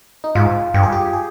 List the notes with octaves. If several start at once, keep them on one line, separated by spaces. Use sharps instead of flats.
D#4
G#2 F4
G2 G4
G#4
G4
G#4